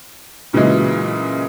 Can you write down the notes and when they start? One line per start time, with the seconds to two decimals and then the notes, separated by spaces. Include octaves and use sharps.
0.53 A#2 C#3 E3 F#3 G#3